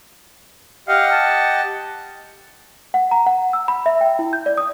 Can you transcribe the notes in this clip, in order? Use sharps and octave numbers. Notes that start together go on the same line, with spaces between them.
G4 D#5 F5 F#5
A5
F#5
A#5
F#5
E6
B5
E5
G5
E4
G6
D5
D#6